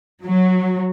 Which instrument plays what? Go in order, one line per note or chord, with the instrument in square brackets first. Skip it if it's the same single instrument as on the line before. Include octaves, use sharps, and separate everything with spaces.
[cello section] F#3